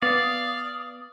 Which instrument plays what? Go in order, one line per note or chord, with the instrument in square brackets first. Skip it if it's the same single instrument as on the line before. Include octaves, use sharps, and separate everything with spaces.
[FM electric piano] B3 [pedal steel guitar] D5 [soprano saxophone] F5 [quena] D#6